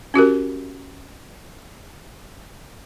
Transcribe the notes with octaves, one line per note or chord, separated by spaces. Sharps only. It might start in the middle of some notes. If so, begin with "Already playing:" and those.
C#4 F#4 G4 A#4